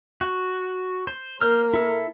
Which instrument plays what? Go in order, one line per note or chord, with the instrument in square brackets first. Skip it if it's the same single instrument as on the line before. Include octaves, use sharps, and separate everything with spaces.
[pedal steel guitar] F#4
C5
[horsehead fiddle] A#3 A#4 [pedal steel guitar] C5 F6
[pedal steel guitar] E4 A4